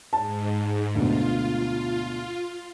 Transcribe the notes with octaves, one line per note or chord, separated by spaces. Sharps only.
G#2 A5
D2 B2 F4